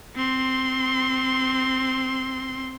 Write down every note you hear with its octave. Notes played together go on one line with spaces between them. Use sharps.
C4 C6